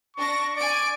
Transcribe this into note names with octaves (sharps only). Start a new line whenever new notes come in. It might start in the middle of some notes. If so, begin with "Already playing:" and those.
D4 C#6 A#6
D5 G#5 D7